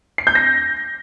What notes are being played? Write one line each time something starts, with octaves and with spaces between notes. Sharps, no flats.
C7
G6
A#6